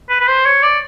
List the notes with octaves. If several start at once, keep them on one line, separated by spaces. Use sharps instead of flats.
B4
B4
C5
C#5
D5